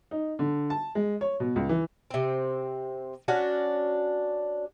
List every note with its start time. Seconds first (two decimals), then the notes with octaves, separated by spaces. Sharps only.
0.11 D#4
0.39 D3
0.70 A5
0.95 G#3
1.21 C#5
1.40 B2
1.56 C#2
1.69 E3
2.11 C3 C4
3.28 C#4 D4 F#4 F#5